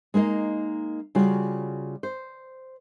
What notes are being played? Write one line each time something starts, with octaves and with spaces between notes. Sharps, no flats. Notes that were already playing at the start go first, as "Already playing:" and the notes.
G#3 A#3 D#4 D#5
C#3 G3 F4 F#4
C5